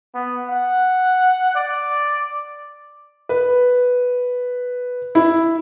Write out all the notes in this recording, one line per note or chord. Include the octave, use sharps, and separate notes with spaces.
B3
F#5
D5
B4
E4